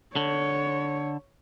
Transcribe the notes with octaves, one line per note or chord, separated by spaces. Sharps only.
D3 C#5